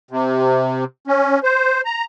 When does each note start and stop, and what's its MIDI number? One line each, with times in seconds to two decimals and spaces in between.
0.11 0.84 48
1.07 1.39 61
1.43 1.81 72
1.85 2.04 82